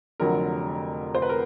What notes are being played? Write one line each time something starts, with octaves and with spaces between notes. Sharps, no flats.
F1 F2 D3 F#3 A#4
C5
B4
A#4